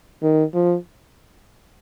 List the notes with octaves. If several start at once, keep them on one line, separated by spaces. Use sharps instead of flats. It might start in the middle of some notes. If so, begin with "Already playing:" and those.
D#3
F3